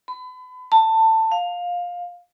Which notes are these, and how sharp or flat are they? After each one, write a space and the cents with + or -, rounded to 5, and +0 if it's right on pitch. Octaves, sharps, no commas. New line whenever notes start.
B5 +35
A5 +20
F5 +15